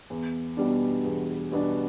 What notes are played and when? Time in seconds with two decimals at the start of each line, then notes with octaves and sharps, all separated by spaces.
0.10 E2
0.57 B2 G3 B3 D4
1.05 E2
1.52 B2 G3 B3 D4